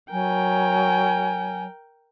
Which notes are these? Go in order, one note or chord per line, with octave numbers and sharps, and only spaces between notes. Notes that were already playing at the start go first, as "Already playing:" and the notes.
F#3 A#4 G5 G#5